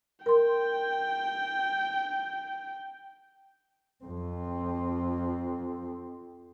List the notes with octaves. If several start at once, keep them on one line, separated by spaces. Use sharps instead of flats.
A#4 G5 C6
F2 C4